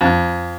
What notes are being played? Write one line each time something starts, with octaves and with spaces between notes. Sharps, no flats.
F2